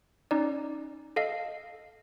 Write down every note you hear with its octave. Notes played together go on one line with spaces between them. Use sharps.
C#4 D#4 D5
A4 D#5 F5